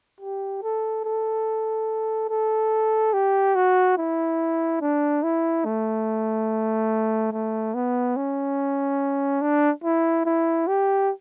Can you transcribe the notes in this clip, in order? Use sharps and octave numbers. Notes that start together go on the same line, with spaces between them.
G4
A4
A4
A4
G4
F#4
E4
D4
E4
A3
A3
B3
C#4
D4
E4
E4
G4